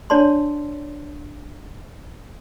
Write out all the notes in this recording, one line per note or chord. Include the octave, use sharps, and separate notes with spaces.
D4 C#5 D5 A5 C6